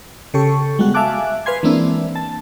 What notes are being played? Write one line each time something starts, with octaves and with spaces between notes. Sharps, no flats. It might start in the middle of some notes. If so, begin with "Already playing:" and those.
C#3 G4 A4 C#6
G3 G#3 B3 F#4
E5 F5 G#5 A5 D6 F#6
B4 F5 G#5 C6 G#6
E3 G#3 A#3 C4 D4 E4
A5